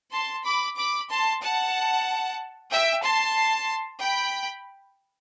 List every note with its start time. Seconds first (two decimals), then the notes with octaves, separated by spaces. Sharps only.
0.13 A5 C6
0.45 B5 D6
0.77 B5 D6
1.09 A5 C6
1.42 F#5 A5
2.71 E5 G5
3.03 A5 C6
4.00 G5 B5